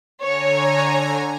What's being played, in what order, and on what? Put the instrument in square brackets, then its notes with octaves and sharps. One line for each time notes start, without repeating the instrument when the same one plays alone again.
[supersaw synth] D3 G#5 A#5 [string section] C#5